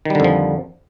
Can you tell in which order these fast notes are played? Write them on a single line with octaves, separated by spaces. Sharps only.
D#3 G3 D3 F2 F3